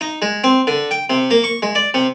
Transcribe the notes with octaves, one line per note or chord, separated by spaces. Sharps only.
D#4
G#3
C4
D3
G5
C3
A#3
C#6
G#3
D5
C3